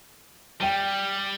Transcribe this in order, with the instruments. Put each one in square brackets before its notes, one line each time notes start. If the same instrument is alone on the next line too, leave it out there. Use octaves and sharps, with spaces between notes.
[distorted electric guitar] G3 [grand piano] G5 D#7 G7